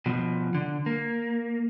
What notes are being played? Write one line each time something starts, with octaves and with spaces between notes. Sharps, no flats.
B2 F3
D3
A#3